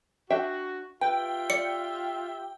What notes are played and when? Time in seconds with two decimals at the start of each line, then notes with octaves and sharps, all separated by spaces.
0.30 D4 F#4 E5 G5
1.01 F4 G4 B4 E5 G5
1.50 D5 C#7